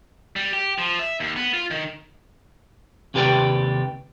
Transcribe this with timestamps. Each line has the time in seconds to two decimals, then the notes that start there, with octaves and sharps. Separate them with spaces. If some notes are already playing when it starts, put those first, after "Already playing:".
0.36 G3
0.53 G4
0.78 F3
0.99 E5
1.20 D#2
1.37 B3
1.54 F4
1.71 D#3
3.14 D#2 C3 G4 B4 D5 G5